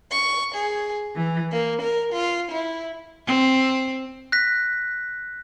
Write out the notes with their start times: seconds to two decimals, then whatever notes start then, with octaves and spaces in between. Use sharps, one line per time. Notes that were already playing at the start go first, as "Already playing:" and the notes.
0.11 C#6
0.54 G#4
1.16 E3
1.51 A#3
1.81 A#4
2.13 F4
2.51 E4
3.26 C4
4.32 F#6 A#6 B6